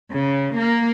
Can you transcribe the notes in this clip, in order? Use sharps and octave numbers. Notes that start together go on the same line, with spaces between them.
C#3
A#3